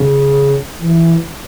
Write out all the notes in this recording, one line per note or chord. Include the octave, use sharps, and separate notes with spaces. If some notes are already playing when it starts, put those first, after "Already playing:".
Already playing: C#3
E3